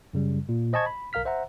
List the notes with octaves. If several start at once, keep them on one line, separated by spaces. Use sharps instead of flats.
F#2 C#3 G3
A#2
C5 D#5 G#5 A5 C#6 G#6
B5
B1 A#4 F5 F6 B6
C5 E5 F#5 A#5